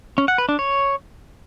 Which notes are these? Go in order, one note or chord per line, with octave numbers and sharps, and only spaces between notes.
C#4
F#5
B4
D4
C#5